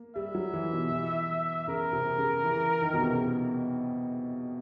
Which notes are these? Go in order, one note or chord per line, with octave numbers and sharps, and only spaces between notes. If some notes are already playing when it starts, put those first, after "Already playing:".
Already playing: A#3
G3 E5
F#3
E3
B2
E3
C#3 A#4
C3
C#3
E3
D#3
B2
C3
C#3